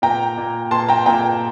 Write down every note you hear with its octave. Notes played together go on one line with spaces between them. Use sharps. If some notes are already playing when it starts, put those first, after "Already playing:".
A#2 G5 A#5
A#2
A#2 A5 C6
G5 A#5
A#2 G5 A#5